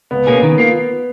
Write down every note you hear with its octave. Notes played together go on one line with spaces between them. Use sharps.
C#2 B3
B2 A#3 C#4 G#4
D#3
A#3 F4